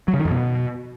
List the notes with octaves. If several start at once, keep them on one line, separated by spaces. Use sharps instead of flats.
F#3
C#3
D#3
F2
B2